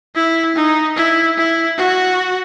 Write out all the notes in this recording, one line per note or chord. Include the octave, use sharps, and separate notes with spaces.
E4
D#4
E4
E4
F#4